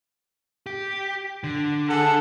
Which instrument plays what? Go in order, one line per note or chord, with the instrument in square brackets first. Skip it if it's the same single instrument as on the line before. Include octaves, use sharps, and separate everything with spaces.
[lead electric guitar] G4
D3
[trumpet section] G#4 A4 F#5